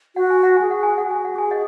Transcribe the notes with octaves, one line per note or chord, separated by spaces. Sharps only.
F#4 F#5
G#5
F#5
G#4 G#5
F#5
G#5
F#5
F#4 G#5
F#5
G#4 G#5
D#5 F#5